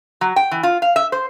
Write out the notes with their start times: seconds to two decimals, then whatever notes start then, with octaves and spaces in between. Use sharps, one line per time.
0.21 F#3
0.36 G5
0.51 E3
0.63 F4
0.82 F5
0.96 E5
1.12 C5